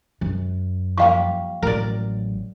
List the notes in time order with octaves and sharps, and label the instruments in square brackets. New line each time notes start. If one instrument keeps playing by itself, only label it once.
[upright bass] F#2
[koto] F3 G3 A#3 [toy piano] F5 C#6
[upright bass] A1 F#3 [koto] A#4 D5